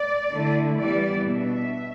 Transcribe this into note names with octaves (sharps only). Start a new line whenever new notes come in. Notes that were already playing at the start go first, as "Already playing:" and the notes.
Already playing: D5
D3 A3 E4
E3 G3 B3 E4 D5
B2 B3 D4 E5